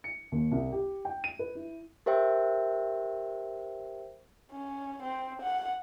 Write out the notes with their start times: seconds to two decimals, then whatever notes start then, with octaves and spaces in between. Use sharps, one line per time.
0.04 C#7
0.32 D#2
0.51 C2
0.72 G4
1.05 G5
1.24 D#7
1.39 B4
1.55 E4
2.06 G4 A#4 C5 E5 G5
4.51 C#4
5.03 C4
5.43 F#5